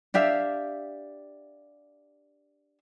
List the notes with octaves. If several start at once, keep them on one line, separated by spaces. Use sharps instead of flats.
D4 G4 E5 F5